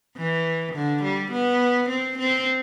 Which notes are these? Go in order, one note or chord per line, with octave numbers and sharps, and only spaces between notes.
E3
D3
G3
B3
C4
C4